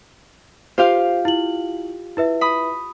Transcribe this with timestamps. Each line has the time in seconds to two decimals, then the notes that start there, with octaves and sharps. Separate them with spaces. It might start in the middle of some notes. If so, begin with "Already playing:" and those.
0.78 F4 G4 C5 F5
1.25 E4 F#7
2.17 E4 B4 E5
2.41 B5 D#6